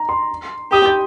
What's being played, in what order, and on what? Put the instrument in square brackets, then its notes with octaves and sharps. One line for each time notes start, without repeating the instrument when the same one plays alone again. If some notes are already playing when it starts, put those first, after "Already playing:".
Already playing: [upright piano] A#5
C6
[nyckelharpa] G4 [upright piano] D#6
[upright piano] G6